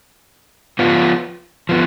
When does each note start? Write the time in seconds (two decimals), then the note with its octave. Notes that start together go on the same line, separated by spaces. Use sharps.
0.79 F3 B3 F4
1.69 F3 B3